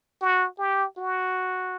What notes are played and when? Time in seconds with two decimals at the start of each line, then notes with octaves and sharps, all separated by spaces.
0.21 F#4
0.59 G4
0.98 F#4